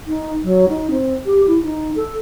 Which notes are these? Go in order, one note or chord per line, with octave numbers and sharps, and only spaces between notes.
D#4
F#3
D#4
C4
G4
E4
D#4
A4